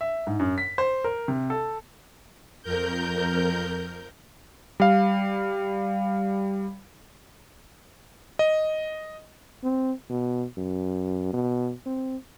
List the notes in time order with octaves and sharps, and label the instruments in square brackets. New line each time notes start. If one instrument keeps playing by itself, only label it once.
[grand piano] E5
G#2
F#2
B6
C5
A#4
C3
A4
[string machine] F2 A#4 G6
[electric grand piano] G3 F5
D#5
[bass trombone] C4
B2
F#2
B2
C4